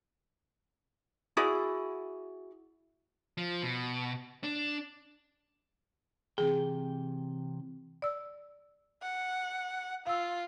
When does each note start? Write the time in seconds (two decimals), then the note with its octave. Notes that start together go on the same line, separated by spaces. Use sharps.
1.37 E4 F#4 G#4 D5
3.37 F3
3.62 B2
4.43 D4
6.38 C3 E3 G#4 G5
8.02 D5 E6
9.02 F#5
10.07 F4 F5 E6